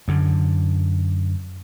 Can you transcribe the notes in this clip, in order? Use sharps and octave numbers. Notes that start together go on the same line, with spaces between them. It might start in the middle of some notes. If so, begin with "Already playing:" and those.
F#2 D3